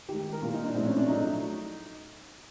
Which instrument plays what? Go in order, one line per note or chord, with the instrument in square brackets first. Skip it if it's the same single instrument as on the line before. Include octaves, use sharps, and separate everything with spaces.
[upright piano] D#3 G4
G#3
A#4
A#2 G3 A#3 F4
D#4
D4
A2 F3 G#3 C4
C#4
D4
A2 F#3 A3 D#4